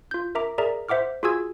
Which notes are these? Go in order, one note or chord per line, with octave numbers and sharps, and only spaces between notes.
F4 G6
A#4 E5 A#5 D6
G#4 A#4 D5 E5 A#5
C5 E5 F#5 D6 F6
F4 F#4 G#4 G#5 E6 G#6